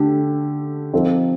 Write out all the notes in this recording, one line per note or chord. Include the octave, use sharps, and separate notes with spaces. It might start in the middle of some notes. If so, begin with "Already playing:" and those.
Already playing: D3 A3 G4
F3 C4 D#4 A4